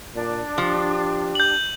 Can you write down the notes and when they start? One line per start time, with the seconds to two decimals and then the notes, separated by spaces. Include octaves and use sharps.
0.15 A#2 D4
0.58 F3 G4
1.35 G6 F#7